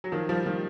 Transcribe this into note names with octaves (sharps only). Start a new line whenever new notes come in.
F#3
D#3 F3
F3 G3
D#3 F3